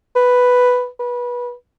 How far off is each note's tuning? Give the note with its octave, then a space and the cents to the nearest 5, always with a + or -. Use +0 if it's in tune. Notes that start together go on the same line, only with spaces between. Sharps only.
B4 +0
B4 -20